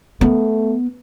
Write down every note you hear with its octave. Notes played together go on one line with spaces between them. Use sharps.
A3 B3